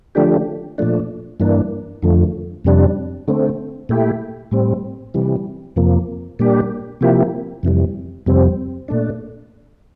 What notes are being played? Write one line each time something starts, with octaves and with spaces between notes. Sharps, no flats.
D3 F3 A3 D4 G4
A#2 F3 A3 D4
G2 E3 A#3 D4
F2 D3 F3 A3
F2 C3 G3 D4
D3 A3 C4
A#2 A3 E4 G4
A2 G3 C4
C3 E3 G3
F2 C3 F3 A#3
A#2 G3 A#3 D4 G4
C3 F3 A#3 E4 G4
F2 C3 E3 G3
F2 C3 G3 C4
A#2 A3 D4